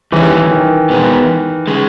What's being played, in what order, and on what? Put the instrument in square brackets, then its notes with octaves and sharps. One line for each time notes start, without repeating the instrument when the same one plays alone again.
[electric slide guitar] D#3 G3 C#4 [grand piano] E3
[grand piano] D#3
[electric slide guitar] E2 B2 G#3 B3
C#3 G#3